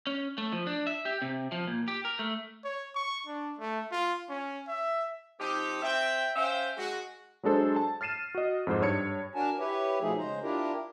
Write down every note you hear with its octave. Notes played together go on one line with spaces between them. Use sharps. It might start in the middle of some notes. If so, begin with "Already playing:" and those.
C#4
A3
F3
D4
E5
G4
C3
F3
A#2
G4
A#4
A3
C#5
C#6
D4
A3
F4
C#4
E5
F3 C4 D#4 G4
C4 E5 G5
C#4 C5 E5 F5 G5
G#3 F#4
F#3 G#3 D4 A4 C5
A5
F6 A6 C7 D#7 E7
F#4 D#5
F2 G#2 C5
G2 C#5 G#6 C#7
D4 F#4 A#4 G#5 A5
E4 G4 B4 C#5
B2 F3 A3 D#4 G#4
C#3 G#3 C5 A#5
D4 E4 F4 G4 A#4